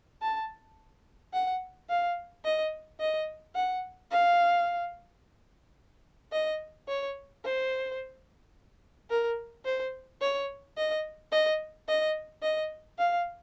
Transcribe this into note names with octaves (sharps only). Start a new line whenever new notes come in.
A5
F#5
F5
D#5
D#5
F#5
F5
D#5
C#5
C5
A#4
C5
C#5
D#5
D#5
D#5
D#5
F5